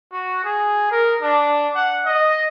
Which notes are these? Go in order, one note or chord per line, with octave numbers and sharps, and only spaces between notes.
F#4
G#4
A#4
D4
F#5
D#5